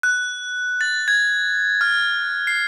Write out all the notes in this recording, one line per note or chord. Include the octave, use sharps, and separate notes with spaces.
F#6
A6
G#6
F6
C7